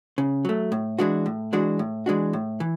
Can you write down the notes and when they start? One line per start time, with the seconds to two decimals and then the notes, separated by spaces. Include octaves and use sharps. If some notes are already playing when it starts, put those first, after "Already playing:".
0.18 C#3
0.45 F#3 A3
0.72 A2
0.99 E3 G#3 D4 F#4
1.26 A2
1.53 E3 G#3 D4 F#4
1.79 A2
2.06 E3 G#3 D4 F#4
2.33 A2
2.60 E3